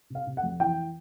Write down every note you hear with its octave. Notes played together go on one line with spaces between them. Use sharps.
C3 F5
C3
F#5
F2
E3 G5